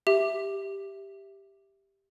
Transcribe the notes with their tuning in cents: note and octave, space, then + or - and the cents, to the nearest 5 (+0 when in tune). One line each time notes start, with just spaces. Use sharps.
G4 +0 E5 +0